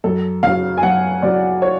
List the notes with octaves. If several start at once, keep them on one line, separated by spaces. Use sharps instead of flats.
F#2 A4
C#3 F#3 F5
G#5
F#2 F#5
C#3 F#3 D5
C#5